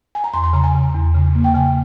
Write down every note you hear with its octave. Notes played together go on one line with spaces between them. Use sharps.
G#5
A#5
E2 C6
C6
C#3 A#5
G#5
C#3
E2
C#3
A#3
G5
C#3 G#5